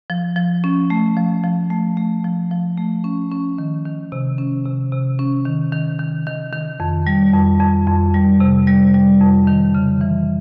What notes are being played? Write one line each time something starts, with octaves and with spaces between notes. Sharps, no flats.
F3
F3
C#4
A3
F3
F3
A3
A3
F3
F3
A3
C#4
C#4
D#3
D#3
C3
C#4
C3
C3
C#4
D#3
D#3
D#3
D#3
D#3
F2
G3
F2
F2
F2
G3
C3
G3
G3
F2
D#3
C#3
E3